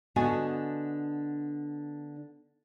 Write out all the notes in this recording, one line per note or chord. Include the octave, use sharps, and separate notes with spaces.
D3 B3 D4 F#4 D#5 G#5